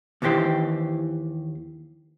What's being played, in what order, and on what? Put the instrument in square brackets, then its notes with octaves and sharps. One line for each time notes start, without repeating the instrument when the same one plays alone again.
[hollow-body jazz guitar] D#2 D#3 E3 G4 C5 G5